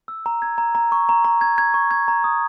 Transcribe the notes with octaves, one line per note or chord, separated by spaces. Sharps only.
E6
A#5
G#6
A#5
A#5
C#6
A#5
A#5
G#6
G#6
C#6
G#6
A#5
D#6